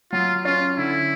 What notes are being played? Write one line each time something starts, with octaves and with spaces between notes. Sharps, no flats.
F#3 F4
C#4 F4
D3 E4